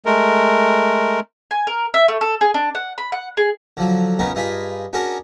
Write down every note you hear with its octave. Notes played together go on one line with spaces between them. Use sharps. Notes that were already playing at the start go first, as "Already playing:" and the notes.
G#3 A3 A#4
G#5
A#4
E5
A3
A4
G#4
D4
F#5
B5
F#5
G#4
D3 F3 F#3
C#2 B3 C#4 D#4 A#4
G2 D#4 F4 G#4 B5
C#4 D4 F#4 G#4 A#4 A5